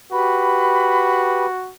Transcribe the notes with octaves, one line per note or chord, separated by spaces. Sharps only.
F#4 G4 B4 B5